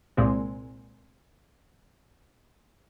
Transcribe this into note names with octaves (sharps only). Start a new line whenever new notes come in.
C2 A#2 G#3 C4